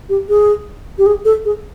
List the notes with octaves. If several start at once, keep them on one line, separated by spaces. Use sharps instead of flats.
G4
G#4
G4
G#4
A4
G#4